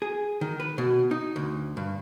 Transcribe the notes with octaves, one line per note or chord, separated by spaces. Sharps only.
G#4
D#3
B4
B2
D#4
D2
G2